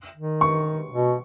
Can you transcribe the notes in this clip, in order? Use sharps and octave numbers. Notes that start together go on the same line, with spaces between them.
D#3
C#6
B2